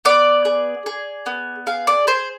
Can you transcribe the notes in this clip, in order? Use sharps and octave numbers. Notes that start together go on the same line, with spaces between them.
B3 D5
G#4
G#4
B3
G#4 F5
D5
G#4 C5